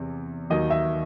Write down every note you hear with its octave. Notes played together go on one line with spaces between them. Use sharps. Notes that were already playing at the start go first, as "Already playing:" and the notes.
Already playing: E2 C3
D#2 D#3 F#3 D#5
E5